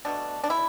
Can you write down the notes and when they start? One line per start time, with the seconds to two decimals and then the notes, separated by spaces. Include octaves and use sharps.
0.05 B2 A3 D4
0.44 D4
0.50 E4